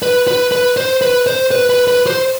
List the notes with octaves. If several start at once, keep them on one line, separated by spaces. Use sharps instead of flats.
B4
B4
B4
C5
B4
C5
B4
B4
B4
C5